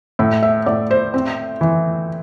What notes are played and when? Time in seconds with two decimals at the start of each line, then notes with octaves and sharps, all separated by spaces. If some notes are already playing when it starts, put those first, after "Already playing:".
0.19 A2 E5
0.43 E5
0.66 A2 D5
0.91 C5
1.14 C4
1.61 E3